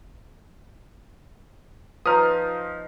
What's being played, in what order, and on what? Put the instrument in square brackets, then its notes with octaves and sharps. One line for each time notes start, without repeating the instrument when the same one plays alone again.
[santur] F3 D#4 [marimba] B4 A#5 [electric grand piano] D#6 F6